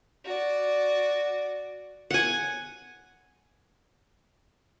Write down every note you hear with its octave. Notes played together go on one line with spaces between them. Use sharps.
F#4 D5
F#5 G#5